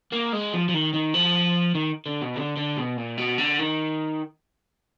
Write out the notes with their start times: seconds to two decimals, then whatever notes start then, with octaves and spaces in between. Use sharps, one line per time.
0.12 A#3
0.33 G#3
0.54 F3
0.69 F3
0.74 D#3
0.94 D#3
1.14 F3
1.75 D#3
2.06 D3
2.22 B2
2.36 D3
2.57 D3
2.78 B2
2.98 A#2
3.18 B2
3.38 D3
3.59 D#3